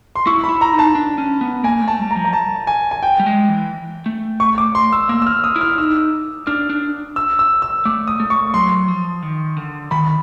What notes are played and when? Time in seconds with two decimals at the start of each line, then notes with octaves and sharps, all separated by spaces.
0.16 C6
0.27 E4 C#6
0.44 B5
0.49 E4
0.61 A#5
0.73 D#4
0.79 A5
0.95 D4
1.18 C#4
1.41 B3
1.64 A#3 G#5
1.82 A3
1.88 A5
1.99 G3
2.11 A#5
2.16 F3
2.25 A#5
2.33 A5
2.67 G#5
2.91 G#5
3.03 G5
3.20 G3
3.26 G#3
3.49 E3
4.06 A3
4.40 C#6
4.58 D6
4.75 C6
4.93 E6
5.09 A#3 E6
5.22 E6
5.27 F6
5.44 D#6
5.56 E4
5.61 F6
5.78 D#4 E6
6.47 D4 F6
6.70 D4
7.16 E6
7.39 E6
7.62 E6
7.85 A3 D6
8.08 D#6
8.20 A3
8.30 C#6
8.54 F#3 C6
8.88 F3
9.22 D#3
9.57 D3
9.91 D#3 B5